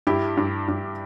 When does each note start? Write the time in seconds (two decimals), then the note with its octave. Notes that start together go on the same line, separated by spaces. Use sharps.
0.07 G2 E4 G4
0.37 G2
0.68 G2